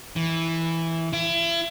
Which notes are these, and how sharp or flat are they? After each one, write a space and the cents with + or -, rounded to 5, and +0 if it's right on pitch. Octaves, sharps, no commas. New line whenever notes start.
E3 -5
E4 +35